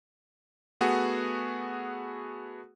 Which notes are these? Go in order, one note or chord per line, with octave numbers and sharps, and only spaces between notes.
A3 B3 F#4 G#4